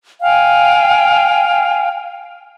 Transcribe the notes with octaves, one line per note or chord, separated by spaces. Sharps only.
F5 G5 G#5